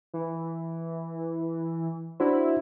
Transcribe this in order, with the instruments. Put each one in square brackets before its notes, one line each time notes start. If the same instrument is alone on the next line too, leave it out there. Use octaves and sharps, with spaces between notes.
[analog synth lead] E3
[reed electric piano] D4 F#4 C5 [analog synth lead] E4